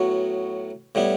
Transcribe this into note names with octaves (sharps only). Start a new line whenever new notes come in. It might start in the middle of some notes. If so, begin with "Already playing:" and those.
Already playing: A2 F#3 B3 F#4
A2 G3 B3 E4